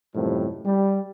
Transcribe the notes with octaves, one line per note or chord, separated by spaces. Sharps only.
F#2 A2 C3 D#3 F3 G3
G3